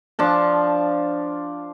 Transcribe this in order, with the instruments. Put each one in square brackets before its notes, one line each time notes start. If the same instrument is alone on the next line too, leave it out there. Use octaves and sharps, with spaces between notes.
[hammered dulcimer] F3 D4 A5